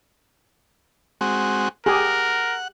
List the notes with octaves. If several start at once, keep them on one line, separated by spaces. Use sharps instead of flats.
G#3 C4 F#4
G4 G#4 A#4 F#5